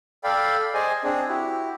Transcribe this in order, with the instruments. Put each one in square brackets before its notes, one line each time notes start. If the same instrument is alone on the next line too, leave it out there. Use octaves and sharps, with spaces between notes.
[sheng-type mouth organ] A4 D5 F5 G5 B5
G#4 C5 D5 D#5 G#5
C4 D4 G#4
E4 F#4 G4